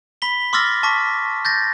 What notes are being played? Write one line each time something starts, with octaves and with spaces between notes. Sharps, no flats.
B5 B6 G7
C6 D6 E6 F6 A6 A#6
A5 C#6 D6 B6
G6 A6 A#6